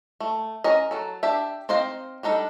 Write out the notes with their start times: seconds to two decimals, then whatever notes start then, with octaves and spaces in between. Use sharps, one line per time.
0.20 A3
0.64 C#4 A#4 D#5
0.91 F#3 A4
1.23 D4 G4 E5
1.69 C4 D#4 C5 D#5 F5
2.23 G3 D4 D#4 A4